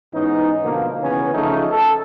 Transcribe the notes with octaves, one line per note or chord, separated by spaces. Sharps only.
G#2 E3 B3 C#4 D#4
B2 D3 F3 A#3
C#3 E3 B3 C#4
C#3 F3 A3 C#4 D#4 A4
A4